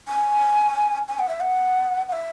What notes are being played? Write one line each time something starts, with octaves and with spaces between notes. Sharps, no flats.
G#5
G#5
F#5
E5
F#5
F#5
E5